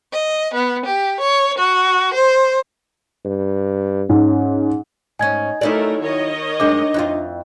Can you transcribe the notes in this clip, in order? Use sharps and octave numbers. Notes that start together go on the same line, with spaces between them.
D#5
B3
G4
C#5
F#4
C5
G2
G#2 C#4
G#2 C#4 D#4 G#5 G#6
F#3 A3 D#4 E4 A4 A#4 D5
D#3 C#5 D#5
F#2 G#3 D4 D#4 D6
F2 E4 F4